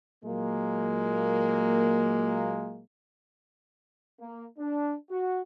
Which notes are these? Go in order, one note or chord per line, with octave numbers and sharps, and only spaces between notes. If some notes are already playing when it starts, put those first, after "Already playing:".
A#2 F#3 G#3 A#3
A#3
D4
F#4